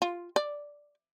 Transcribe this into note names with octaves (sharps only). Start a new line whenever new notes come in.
F4
D5